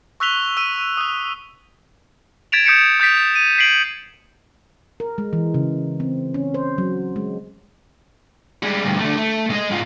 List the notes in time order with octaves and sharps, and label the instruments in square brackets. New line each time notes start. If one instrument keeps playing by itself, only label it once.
[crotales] C#6 E6 F#6 B6 F7 G7
E6 D#7
D#6 F#6
G#6 A6 B6 D7 E7 F7
D#6 G6 B6 C#7 D7 E7
D#6 G6 A6 B6 D7
A6
D#7
B6 C7 D7 F#7
[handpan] A#4
G#3
E3
C#3
C4
C#4
C5
F#3
G#3
[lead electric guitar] G3 G#3
D2 G2
D3 A3
A3
G#3 D#5
G#2 F4